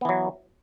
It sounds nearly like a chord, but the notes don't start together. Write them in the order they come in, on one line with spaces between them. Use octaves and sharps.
B3 E3 F#3